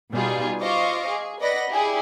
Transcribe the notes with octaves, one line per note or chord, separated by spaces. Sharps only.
B2 G3 B3 D#4 F4 G#4
F4 C5 D#5 F5 C#6 D6
G#4
B4 D5 D#5 F#5 B5 A#6
E4 G4 G#4 D5